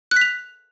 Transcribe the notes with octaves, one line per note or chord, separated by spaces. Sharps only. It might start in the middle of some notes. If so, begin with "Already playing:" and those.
F#6
B6
F7